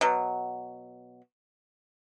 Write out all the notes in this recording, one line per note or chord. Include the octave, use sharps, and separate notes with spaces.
B2 F#3